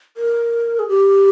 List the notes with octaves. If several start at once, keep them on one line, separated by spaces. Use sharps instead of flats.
A#4
G#4
G4